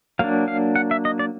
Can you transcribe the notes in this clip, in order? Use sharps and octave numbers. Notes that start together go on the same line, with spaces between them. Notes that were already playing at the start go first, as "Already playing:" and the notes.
F#3 A#3 D4 F5
F5
F#5
E5
D#5
D5